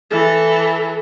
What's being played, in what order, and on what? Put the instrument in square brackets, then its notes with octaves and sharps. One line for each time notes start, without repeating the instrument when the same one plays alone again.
[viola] E3 A4